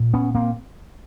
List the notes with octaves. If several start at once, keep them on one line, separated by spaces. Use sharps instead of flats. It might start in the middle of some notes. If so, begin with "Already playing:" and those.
Already playing: A#2
B3 C#4
A#3 C4